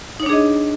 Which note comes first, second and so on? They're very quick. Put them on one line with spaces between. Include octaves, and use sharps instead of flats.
D#4 C#5 D4 G#4 D#5